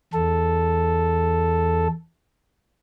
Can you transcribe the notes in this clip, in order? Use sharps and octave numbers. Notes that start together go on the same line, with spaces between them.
E2 A4